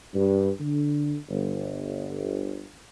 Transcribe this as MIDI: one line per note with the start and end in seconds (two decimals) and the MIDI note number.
0.14 0.50 43
0.60 1.15 50
1.29 2.68 31